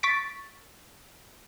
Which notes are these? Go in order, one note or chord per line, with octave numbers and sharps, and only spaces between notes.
C#6 A6 B6 D7